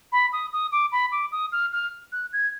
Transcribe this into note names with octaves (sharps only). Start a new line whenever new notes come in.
B5
D#6
D#6
D6
B5
D6
D#6
F6
F6
F#6
G#6